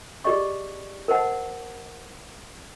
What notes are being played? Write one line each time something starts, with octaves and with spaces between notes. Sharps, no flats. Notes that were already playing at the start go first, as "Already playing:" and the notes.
G4 G#4 D5 D#5 C#6
A#4 C5 D#5 F#5 A5